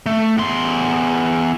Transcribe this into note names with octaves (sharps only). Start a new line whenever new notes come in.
A3
E2 C6